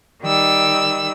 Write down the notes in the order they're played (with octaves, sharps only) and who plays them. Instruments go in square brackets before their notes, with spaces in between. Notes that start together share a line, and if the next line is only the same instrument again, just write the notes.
[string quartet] D#3 G3 E6